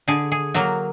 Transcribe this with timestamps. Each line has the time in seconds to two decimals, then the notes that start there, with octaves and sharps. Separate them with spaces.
0.08 D3 G#4
0.32 G#4
0.54 F#3 A#3 F#4